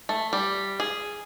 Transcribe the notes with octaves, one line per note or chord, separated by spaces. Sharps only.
A3
G3
G#4